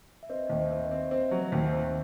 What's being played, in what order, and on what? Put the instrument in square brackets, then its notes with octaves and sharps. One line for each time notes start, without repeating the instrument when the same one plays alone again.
[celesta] E5
[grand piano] C4 [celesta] B4 D#5
[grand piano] D#2 [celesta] D#5
[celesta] C5 E5
[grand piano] C4
[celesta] E5
B4 D#5
[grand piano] C4
[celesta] D#5
[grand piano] C4 [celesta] C5 E5
[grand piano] F#3
[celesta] B4 D#5
[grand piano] D#2
[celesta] C5 E5
[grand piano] C4